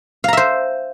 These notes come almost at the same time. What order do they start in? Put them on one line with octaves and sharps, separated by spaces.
F5 A#5 E5 C5